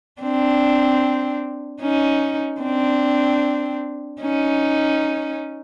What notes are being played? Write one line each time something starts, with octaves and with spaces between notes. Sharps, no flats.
C4 D4
C#4 D#4
C4 D4
C#4 D#4